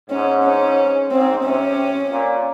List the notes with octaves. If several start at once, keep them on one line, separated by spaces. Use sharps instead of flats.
G#2 C#4
C#4
G#2 C4
C3 C#4
A#2